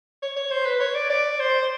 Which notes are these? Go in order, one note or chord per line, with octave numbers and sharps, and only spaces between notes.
C#5
C#5
C5
B4
C#5
D5
D5
C5